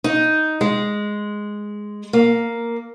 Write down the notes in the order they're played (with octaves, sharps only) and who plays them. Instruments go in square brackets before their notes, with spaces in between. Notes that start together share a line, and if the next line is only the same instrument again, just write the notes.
[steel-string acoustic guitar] D#4
G#3
A#3